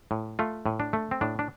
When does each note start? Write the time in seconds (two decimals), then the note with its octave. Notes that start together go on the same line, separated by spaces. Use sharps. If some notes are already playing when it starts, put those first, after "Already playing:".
0.11 A2
0.39 A3 F4
0.66 A2
0.80 D4
0.93 A3
1.11 C4
1.21 A2 D4
1.39 D4